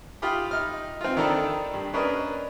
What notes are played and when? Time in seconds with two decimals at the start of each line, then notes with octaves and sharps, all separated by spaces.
0.22 F4 G4 B5 D#6
0.51 D#4 F6
1.01 C4 F4
1.17 D#3 D4 A4 A#5 B5
1.74 G2
1.94 C#4 D4 A#4 B4 D#5